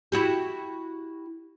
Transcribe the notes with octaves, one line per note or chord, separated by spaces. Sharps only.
E4 F#4 G4